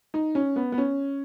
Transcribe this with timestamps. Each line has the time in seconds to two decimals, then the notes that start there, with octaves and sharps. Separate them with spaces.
0.14 D#4
0.35 C#4
0.56 B3
0.72 B3
0.78 C#4